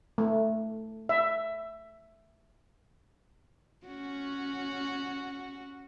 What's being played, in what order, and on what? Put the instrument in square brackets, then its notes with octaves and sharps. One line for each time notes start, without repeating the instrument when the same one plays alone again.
[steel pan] A3
E5
[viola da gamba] C#4 F#4